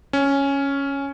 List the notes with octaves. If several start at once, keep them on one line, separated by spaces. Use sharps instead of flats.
C#4